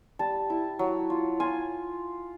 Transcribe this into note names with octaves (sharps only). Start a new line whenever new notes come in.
G3 A5
E4
F#3
F4
F4 G#5